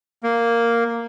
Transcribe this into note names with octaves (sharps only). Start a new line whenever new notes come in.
A#3